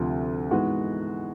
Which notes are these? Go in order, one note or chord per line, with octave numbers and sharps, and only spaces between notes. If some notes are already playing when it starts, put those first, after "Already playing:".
Already playing: D2 C3 F3
G#2 E3 G#3 B3 F#4